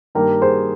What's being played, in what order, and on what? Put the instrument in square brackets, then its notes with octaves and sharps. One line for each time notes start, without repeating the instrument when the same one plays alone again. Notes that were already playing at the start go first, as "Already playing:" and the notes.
[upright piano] G2 D#3 A#3 G4 A#4
G#4 C5